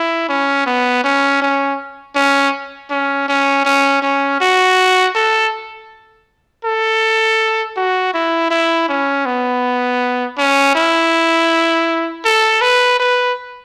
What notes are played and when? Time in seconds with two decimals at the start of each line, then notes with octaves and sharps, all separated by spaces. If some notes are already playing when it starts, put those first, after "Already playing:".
Already playing: E4
0.29 C#4
0.66 B3
1.04 C#4
1.42 C#4
2.15 C#4
2.90 C#4
3.28 C#4
3.65 C#4
4.02 C#4
4.41 F#4
5.15 A4
6.65 A4
7.77 F#4
8.14 E4
8.50 E4
8.89 C#4
9.25 B3
10.38 C#4
10.75 E4
12.25 A4
12.61 B4
12.99 B4